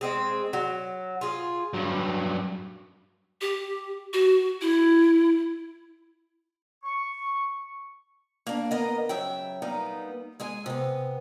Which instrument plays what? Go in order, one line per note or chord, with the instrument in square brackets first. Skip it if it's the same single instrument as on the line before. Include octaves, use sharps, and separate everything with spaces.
[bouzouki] G#3 C4 G#4
F#3
F4 G#4
[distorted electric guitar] G2 F#3
[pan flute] G4
F#4
E4
[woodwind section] C#6
[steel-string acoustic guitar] A#3 D4
A#3 B3 A#4 D#5
C#3 F#3 E5 G5
G3 A#3 B3 D#4
G#3 G#4 G#5
C3 B3